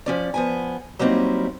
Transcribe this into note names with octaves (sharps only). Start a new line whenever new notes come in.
F3 C#4 D5
F3 B3 G#5
F#3 G3 A#3 C4 D#4 E4